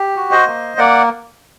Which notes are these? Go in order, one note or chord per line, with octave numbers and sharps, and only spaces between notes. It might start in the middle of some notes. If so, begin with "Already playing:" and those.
Already playing: G4
F#4
C5 D#5
A#3
A#3 D5 F#5